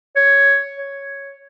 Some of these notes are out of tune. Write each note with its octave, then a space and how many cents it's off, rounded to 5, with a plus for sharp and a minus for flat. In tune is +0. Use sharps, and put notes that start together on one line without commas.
C#5 +5
C#5 +0